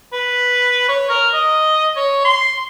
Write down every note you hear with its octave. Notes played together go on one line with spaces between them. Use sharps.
B4
C#5
A#4
D#5
C#5
C6